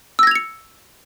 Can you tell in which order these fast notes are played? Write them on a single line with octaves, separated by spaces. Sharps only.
E6 A#6 G#6 F7 C#7